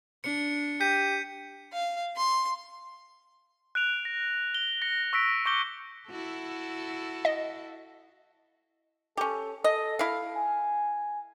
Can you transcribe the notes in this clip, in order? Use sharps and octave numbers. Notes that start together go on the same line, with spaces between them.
D4 C#7
G4 G6 B6 D#7
F5
C6
F#6 D7 F7
A#6
G7
A#6 C#7
C#6 E6 A#6 B6 D7
C#6 D6 G6 A#6 C#7 G7
E4 F#4 A4
D#5
C#4 G4 A4
A4 D#5
E4 F5
G#5